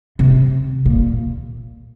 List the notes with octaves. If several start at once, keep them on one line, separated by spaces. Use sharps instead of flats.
C3
A#2